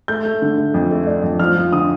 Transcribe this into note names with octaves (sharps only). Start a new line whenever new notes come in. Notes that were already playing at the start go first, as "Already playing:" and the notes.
A3 G6
A3
D3
A3
F2
A3
D4
F2
F3 F6
F3
D3 D#6